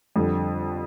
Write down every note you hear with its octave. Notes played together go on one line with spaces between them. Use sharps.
F2 D3 G3